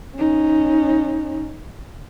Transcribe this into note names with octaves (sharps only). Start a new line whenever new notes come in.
C#4 D#4